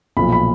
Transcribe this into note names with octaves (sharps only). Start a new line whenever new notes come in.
B1 A#2 F3 B5
B5